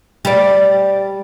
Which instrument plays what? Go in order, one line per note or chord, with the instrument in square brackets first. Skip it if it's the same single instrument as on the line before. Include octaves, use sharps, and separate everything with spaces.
[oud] G3 D5